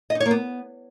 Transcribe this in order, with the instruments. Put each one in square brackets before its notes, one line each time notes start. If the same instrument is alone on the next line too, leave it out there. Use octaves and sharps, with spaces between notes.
[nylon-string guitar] D#5
D#4
C#5
A#3
B3